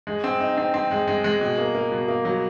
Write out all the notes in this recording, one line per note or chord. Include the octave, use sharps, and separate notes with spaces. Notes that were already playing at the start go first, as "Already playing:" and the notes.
G#3
C4
D#4
C4
C4
G#3
G#3
G#3
B2
A#3
A#3
B2
A#3
F#3